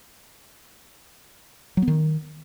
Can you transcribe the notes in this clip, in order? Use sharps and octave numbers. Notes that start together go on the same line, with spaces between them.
F#3
B3
D#3